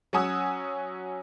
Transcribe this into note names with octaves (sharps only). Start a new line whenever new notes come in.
F#3 C#4 F#5 G#5 D#6 E6